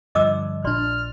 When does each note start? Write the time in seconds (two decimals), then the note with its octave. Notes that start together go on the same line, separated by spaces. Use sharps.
0.15 G2 D3 F3 D#5 D6 E6
0.64 A#1 D4 D5 C6 F6